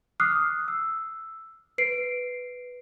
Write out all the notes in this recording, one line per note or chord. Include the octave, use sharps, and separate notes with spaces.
D6 D#6 F6 F#6 C7
E6
B4 C7 D7